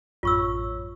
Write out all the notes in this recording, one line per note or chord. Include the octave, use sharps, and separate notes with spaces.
A1 F#2 F4 C#5 C#6 E6